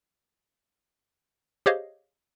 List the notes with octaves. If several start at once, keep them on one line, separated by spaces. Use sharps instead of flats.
G4 G#4 C5 C#5 D#5 F5